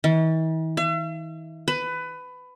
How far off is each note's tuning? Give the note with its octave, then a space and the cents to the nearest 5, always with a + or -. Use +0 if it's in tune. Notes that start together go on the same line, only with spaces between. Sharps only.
E3 -45
E5 +45
B4 +20